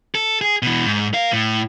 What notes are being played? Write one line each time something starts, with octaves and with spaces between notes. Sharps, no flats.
A4
G#4
B2 E3
G#2
A#4 F5
A2